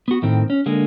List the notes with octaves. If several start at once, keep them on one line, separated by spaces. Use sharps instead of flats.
B3 F#4
A2 D#3 C4
C#4
D3 G#3 A#3